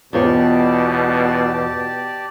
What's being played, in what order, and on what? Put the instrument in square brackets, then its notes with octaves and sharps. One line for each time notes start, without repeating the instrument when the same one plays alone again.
[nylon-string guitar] E2 F4 C#5 [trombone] B2 [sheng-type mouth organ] G4 D5 A5